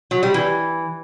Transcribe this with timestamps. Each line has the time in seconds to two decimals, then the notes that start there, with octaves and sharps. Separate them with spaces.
0.11 F#3
0.23 G3
0.34 E3